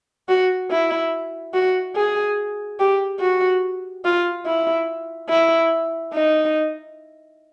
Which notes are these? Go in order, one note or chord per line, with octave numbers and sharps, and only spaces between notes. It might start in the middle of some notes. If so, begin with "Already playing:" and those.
F#4
E4
F#4
G#4
G4
F#4
F4
E4
E4
D#4